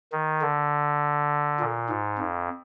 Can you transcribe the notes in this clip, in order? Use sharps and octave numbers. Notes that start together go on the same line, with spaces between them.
D#3
D3
A#2
G#2
F2